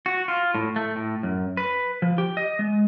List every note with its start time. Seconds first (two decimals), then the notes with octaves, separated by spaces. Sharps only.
0.06 F#4
0.28 F4
0.55 A2
0.76 A3
0.96 A2
1.23 F#2
1.57 B4
2.02 F3
2.18 G4
2.37 D#5
2.59 G#3